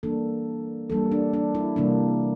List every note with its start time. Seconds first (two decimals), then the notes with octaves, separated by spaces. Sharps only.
0.03 E3 G3 A#3 D4 A4
0.90 E3 G3 A#3 D4 A4
1.12 D4
1.34 D4
1.55 E4
1.76 C3 E3 G3 A#3 D4